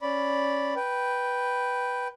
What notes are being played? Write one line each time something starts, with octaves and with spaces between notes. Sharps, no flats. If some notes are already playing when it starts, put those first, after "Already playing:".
C#4 D5 B5
B4 G5